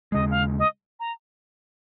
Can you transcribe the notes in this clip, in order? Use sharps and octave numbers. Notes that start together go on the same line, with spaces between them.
D#2 C#3 G#3 D#5
F5
D#5
A#5